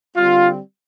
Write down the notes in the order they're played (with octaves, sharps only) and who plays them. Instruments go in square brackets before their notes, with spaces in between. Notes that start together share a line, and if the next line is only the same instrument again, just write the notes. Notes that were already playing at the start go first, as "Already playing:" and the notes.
[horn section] D3 G3 C4 F4